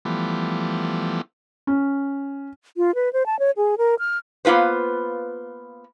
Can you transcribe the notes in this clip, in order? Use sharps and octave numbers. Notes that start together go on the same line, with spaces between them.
E3 F3 G3 A3 B3
C#4
F4
B4
C5
A5
C#5
G#4
A#4
F6
A#3 B3 F4 B4 C5